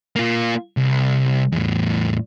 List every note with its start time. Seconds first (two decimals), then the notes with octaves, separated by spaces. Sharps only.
0.16 A#3 F4
0.77 C2
1.52 E2 A2